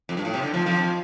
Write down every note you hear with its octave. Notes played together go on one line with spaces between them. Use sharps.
F2
G2
A2
C3
D3
F2 F3
F2 F3
F2